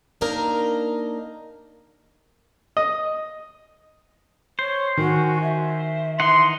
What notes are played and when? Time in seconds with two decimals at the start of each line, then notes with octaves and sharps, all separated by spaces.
0.21 A#3 D4 D#4 A#4
2.77 D#5
4.59 C5 C#5
4.97 D#3 F#4 G#5
5.42 E5
6.20 E3 D#4 F#5 C6